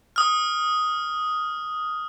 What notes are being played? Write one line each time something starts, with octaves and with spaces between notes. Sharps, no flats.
D#6 F6